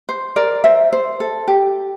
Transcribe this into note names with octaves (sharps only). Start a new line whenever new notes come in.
C5
A#4 D5
C5 E5
C5
A4
G4